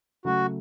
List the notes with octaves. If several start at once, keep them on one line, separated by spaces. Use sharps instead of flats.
C#3 F#3 A3 F#4